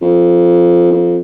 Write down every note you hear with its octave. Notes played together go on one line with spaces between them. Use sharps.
F2
F2